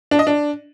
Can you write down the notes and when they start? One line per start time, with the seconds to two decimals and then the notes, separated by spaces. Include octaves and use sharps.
0.11 D4
0.19 D#5
0.27 D4